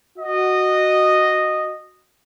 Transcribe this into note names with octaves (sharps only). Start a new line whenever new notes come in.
F#4 D#5